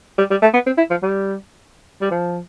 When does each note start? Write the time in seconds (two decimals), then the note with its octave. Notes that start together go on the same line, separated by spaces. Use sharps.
0.18 G3
0.31 G3
0.42 A3
0.54 B3
0.66 C4
0.78 E4
0.90 F3
1.03 G3
2.02 G3
2.11 F3